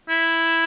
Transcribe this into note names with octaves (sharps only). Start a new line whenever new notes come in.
E4